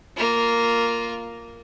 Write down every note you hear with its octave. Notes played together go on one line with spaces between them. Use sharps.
A#3 F4